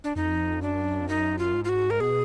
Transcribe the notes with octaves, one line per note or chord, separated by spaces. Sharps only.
D4
F2 D#4
F#2 D4
F2
F#2 D#4
F4
G#2
F4
F#4
A#4
B2 G#4